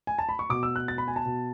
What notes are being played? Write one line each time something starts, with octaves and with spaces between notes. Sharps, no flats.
G#5
A5
B5
C#6
B2 D6
E6
F#6
A6
B5
G#5
A5
B2